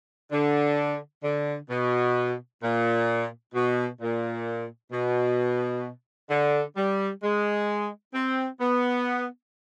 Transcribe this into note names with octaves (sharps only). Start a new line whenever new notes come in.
D3
D3
B2
A#2
B2
A#2
B2
D3
G3
G#3
C4
B3